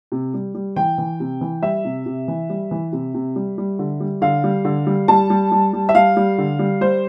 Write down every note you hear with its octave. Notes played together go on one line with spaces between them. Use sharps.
C3
G3
G3
E3 G5
E3
C3
E3
G3 E5
C3
C3
E3
G3
E3
C3
C3
G3
G3
D3
G3
D3 F5
G3
D3
G3
G3 A5
G3
G3
G3
E5
G3 F5
G3
D3
G3
G3 C5